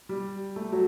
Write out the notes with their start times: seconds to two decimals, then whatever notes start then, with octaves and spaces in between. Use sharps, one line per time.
0.09 G3
0.56 A3
0.72 F#3